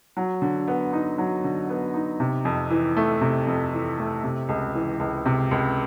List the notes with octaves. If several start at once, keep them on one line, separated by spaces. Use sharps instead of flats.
F#3
D3
B3
D#4
F#3
D3
B3
D#4
C3
F2
E3
A3
C3
F2
E3
A3
C3
C#2
E3
C#2
C3
C#2